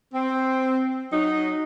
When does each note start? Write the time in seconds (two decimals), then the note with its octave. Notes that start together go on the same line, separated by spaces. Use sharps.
0.14 C4
1.12 F#3 D#4